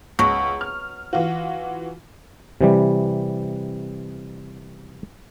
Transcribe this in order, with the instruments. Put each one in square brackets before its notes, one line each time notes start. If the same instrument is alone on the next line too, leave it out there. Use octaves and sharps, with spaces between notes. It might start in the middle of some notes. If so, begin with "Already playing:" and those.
[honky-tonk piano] C#2 [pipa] B2 F#3
[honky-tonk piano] F6
E3 F4 F#4
[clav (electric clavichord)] C3 E3 G3